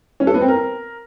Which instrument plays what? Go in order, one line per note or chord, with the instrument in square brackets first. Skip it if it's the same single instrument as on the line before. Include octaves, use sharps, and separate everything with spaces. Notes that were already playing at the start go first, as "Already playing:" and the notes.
[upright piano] C#4
A4
B3
C4
A#4